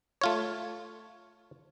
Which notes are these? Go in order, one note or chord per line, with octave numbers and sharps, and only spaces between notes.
A3 F4 C#5